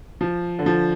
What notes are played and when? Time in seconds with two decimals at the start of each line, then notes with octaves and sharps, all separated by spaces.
0.21 F3
0.59 D3
0.66 F3